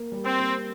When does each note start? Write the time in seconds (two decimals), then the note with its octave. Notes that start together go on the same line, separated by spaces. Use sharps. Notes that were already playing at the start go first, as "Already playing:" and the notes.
Already playing: A#3
0.12 G3
0.25 C4
0.39 A#3